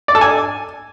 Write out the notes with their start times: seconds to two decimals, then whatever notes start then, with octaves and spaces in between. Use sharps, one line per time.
0.08 D5
0.15 A4
0.21 G#5